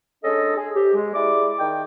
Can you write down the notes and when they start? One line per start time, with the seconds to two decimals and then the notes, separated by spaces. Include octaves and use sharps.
0.24 G#3 C#4 D4 A4 D#5
0.56 G#4
0.75 G#2 G4
0.95 G#3
1.14 E4 G#4 D5 D6
1.59 D#3 G5